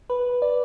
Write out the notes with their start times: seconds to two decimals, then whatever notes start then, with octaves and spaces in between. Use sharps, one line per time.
0.10 B4
0.42 D5